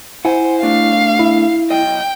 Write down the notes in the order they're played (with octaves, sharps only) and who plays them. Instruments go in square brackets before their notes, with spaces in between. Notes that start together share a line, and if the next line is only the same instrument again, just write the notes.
[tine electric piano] E4 [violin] C5 [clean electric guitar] F#5 G#5
[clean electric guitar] B2 A3 D4 [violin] F5
[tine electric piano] E4
[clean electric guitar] B1 D#5 [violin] G5